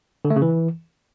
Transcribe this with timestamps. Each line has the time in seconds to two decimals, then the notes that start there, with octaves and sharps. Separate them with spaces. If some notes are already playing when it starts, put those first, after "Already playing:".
0.25 D3
0.30 A3
0.36 C#3
0.42 E3